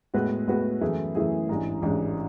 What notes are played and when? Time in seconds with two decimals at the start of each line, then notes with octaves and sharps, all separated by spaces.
0.14 A2 G#3 B3 F#4 B4
0.47 A2 G#3 B3 F#4 B4
0.81 F#2 E3 A3 E4 G#4
1.15 F#2 E3 A3 E4 G#4
1.48 A1 G#2 E3 G#3 D4
1.82 A1 G#2 E3 G#3 D4